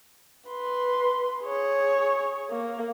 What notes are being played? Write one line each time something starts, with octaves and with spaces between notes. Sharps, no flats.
B4 C6
G#4 C#5
A#3